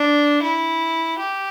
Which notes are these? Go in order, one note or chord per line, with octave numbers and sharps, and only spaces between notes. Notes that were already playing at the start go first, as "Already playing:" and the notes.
Already playing: D4
E4
G4